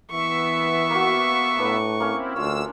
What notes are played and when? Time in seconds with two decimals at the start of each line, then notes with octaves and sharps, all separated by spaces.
0.12 E3 B3 E5 C#6
0.90 A#3 F#4
1.59 A2 D4 B4
2.00 A#3 C4 C#4 E4
2.36 D2 D4 F4 C#5 E6